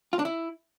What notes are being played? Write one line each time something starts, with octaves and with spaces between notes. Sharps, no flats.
F4
D4
E4